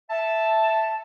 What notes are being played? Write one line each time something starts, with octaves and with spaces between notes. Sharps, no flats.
E5 A5